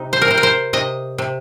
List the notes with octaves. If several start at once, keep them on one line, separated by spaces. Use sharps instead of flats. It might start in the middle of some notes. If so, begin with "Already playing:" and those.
Already playing: C3 D#4
C5
A#4
C3 C5
A#4
C5
C3 D#5
C3